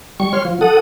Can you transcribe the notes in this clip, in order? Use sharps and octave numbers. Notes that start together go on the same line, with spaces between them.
G3 C#6
C#5 C6 F6
F3
A4 F#5 D#6